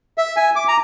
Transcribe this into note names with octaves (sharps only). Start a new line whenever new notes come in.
E5
G#5
D6
A#5